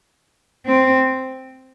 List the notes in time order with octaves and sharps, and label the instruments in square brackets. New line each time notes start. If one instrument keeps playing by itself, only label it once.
[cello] C4